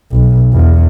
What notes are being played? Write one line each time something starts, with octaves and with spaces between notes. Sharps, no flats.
B1
E2